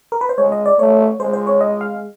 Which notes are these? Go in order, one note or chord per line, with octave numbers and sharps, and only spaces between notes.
A#4
B4
C5
G#3 C#5
D#5
D5
A3 C#5
G#3 C5
C5
C#5
D#5
F5